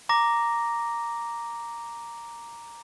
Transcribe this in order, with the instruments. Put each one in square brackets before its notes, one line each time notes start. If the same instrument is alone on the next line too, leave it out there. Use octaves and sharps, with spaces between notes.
[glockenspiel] A#5 D6 A#6